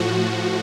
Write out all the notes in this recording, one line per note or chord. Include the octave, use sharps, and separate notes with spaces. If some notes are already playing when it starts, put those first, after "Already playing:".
Already playing: A2 F3 F#4